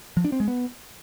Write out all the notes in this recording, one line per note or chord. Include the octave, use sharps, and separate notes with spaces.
F3
D4
C4
G#3
B3